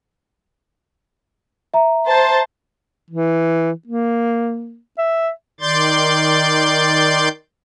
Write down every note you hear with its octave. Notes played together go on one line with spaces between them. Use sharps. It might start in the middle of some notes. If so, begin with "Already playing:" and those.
E5 A#5
C5 A5
E3
A#3
E5
D#3 D5 C6 G6 A6